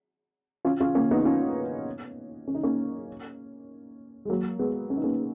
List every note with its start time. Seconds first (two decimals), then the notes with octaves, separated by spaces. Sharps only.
0.65 C#4 F4
0.80 C#4 F4
0.95 A#3 C#4
1.11 B3 D#4
1.25 C#4 F4
2.48 C#4
2.55 D#4
2.63 A#3 C#4
4.25 G#3
4.29 F#3 A#3
4.59 G#3 B3
4.90 C#4
4.97 D#4
5.04 A#3 C#4